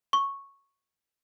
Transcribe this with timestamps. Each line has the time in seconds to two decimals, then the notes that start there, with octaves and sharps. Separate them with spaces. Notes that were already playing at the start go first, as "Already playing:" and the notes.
0.13 C#6